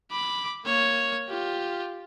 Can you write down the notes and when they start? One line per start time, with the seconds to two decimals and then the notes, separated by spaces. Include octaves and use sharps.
0.12 B5 D6
0.65 A#3 C#5
1.28 F4 G4